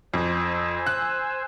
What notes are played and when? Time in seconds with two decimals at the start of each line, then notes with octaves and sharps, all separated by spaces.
0.14 F2 C5 G#5 E6
0.86 F#6